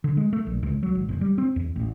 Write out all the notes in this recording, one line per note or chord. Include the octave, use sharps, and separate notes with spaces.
D3
G#3
A3
A#1
C#2
F#3
G#1
F#1
G3
C4
E2
A1